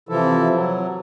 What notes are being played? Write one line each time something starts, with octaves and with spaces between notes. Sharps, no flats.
C3 E3 F3 E4 A4
F#3